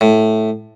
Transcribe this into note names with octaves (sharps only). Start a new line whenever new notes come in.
A2